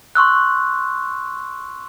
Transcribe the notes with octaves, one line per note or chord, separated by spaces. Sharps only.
C6 C#6 E6 F#6